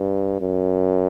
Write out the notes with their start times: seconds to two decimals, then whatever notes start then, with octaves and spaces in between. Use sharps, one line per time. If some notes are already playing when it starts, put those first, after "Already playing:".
Already playing: G2
0.41 F#2